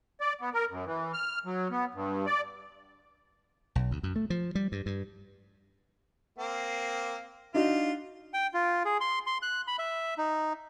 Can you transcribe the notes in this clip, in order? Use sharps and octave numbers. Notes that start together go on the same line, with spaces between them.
D5
B3
A#4
F#2
E3
F6
F#3
B3
G2
D5
B1
D2
F#2
A3
F3
G3
G2
G2
A#3 C4
D4 D#4 F4 F#4
G5
F4
G#4
C6
C6
F#6
B5
E5
D#4